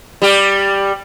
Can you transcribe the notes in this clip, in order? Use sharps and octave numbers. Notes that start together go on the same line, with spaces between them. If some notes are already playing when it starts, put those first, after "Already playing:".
G3 G4